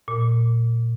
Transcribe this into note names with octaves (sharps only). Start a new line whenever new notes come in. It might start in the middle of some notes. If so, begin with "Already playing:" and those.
A#2